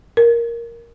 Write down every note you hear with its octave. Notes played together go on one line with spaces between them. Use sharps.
A#4